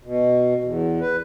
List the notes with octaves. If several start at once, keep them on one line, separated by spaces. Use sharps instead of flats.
B2
E2
B4